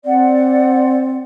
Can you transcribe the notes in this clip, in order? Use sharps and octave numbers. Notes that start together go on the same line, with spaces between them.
C4 D5 F#5